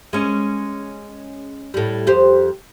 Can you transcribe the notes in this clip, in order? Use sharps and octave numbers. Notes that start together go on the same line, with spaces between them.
G#3 C#4
A2 G3
F2 G4 C5